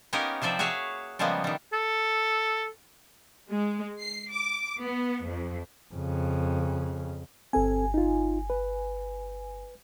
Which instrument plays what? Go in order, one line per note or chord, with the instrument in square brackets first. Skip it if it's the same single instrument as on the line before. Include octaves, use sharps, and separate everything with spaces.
[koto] A#3 B3 C#4 D#4 G4 A#4
C3 F3 C5 D5 E5
F#4 G#4 C#5 E5 F5
C#3 F3 G3 G#3 A#3 B3
D#3 G3
[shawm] A4
[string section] G#3
C7
D6
B3
F2
[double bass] F2 C#3
[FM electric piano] G1 G#5 [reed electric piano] C4 A4
[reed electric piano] D#4 F4
B4